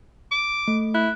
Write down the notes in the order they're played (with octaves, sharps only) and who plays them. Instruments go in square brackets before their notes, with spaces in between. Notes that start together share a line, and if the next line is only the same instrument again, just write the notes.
[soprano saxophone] D6
[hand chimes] A3
[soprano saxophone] E4 [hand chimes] F#6